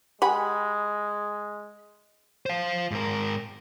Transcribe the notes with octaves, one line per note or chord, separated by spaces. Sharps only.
G#3 G4 F#5 G#5 B5
C5 F5
G#2 A#4